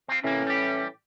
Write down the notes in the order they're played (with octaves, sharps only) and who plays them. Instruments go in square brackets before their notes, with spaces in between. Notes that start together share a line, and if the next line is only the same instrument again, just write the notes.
[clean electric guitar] C4 F4
[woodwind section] A2 E3 C#4 [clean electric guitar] C3 A#3
[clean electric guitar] G3 G4